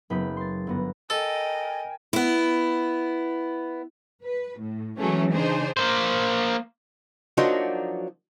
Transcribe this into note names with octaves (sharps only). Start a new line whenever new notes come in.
F#1 B3 B5 D#6 G6 B6
C6 A6
G1 B3 A#6
A4 A#4 D#5 G5 G#5
B3 E4
B4
A2
E3 F#3 G#3 A3 C#4
C#3 D4 D#4 G#4 C5
A#3 C5
F3 F#3 A#3 D4 D#4 F#4